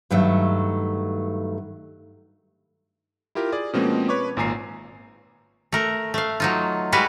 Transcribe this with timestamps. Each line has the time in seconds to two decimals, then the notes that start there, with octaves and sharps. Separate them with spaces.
0.10 G2 D#3 F#3 A3
3.35 E4 F4 G4 A#4
3.52 G#4 D5
3.73 B2 F3 G#3 A#3 C4 C#4
4.09 B4 C#5 C#6 D6
4.37 G#1 A#2 G#5 A#5 C7
5.72 A3 A#4
6.14 A3 F5
6.40 F#3 D#4 F4
6.92 G3 G#3 F#4 B4 F5